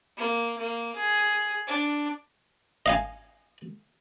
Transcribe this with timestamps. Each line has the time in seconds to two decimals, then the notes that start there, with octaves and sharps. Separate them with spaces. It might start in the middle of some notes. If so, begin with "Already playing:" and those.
0.17 A#3
0.58 A#3
0.95 G#4
1.67 D4
2.86 D#5 F5 G#5